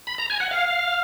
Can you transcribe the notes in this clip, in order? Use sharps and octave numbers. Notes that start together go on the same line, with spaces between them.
B5
A#5
G#5
F#5
F5